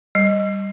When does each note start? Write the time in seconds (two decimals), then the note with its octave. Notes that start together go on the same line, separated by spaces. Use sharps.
0.15 G3